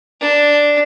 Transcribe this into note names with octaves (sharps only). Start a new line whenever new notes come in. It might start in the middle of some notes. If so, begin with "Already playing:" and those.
D4